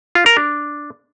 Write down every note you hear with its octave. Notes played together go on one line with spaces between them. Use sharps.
F4
A#4
D4